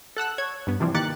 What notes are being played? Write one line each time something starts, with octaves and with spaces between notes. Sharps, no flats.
A4 F#5 E6 F#6
C#5 G#6
G2 B3
C3 E3 F3 G3 C4
D#3 A#3 G4 F#6 A6 C#7